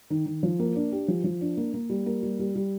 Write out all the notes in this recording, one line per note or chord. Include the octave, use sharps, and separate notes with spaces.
D#3
D#3
F3
A#3
D4
G4
F3
F3
D4
A#3
A#3
G3
A#3
G3
G3
G3